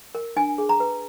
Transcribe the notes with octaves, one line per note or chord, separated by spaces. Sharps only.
A#4
D4 G#5
G#4
A#5
B4